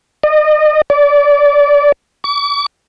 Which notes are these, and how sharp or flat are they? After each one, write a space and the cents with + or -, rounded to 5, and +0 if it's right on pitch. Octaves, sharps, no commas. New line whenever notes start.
D#5 -35
D5 -25
D6 -45